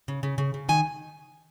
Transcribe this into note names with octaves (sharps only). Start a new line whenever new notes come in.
C#3
C#3
C#3
C#3
D#3 G#5